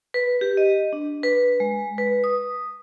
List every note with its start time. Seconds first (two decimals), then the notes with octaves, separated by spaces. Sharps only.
0.14 B4
0.41 G4
0.57 D#5
0.93 D4
1.23 B4
1.60 G#3
1.98 B4
2.24 D#6